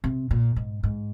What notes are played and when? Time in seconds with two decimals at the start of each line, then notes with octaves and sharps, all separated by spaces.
0.04 C3
0.31 A#2
0.56 G#2
0.83 G#2